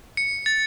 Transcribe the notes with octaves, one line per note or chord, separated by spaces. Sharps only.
C#7
A6